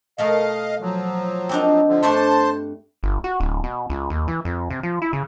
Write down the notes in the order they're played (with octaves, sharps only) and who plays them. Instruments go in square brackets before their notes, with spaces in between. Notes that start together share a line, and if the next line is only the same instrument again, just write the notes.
[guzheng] B2 A3 A#4 [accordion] D#5 F5
[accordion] F3 F#3
[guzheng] C4 D4 D#4
[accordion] D3 F3
[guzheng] G2 A3 D4 [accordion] C5 A5 C6
[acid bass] G1
F#4
D1
B2
C#2
D#2
E3
F2
C3
F3
E4
C#3